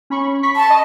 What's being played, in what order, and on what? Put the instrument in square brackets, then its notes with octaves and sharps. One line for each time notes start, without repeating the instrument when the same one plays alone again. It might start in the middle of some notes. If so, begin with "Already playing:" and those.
[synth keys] C#4 B5 C#6
B5 C#6 B6
[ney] A5
[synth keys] D#5